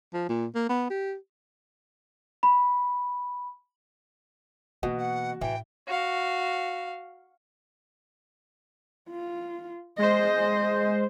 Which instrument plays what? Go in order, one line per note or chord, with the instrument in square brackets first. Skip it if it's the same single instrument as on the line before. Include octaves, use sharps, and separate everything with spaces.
[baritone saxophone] F3
A#2
A#3
B3
G4
[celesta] B5
[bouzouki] B2 [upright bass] E3 A#3 [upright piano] F#4
[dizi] F#5
[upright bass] A2 [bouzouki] E3 [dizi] G5
[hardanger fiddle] F#4 F5
[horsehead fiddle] F4
[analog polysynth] G#3 C5 [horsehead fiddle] D#5